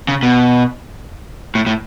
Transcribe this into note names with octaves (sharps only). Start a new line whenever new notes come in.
C#3
B2
A2
A2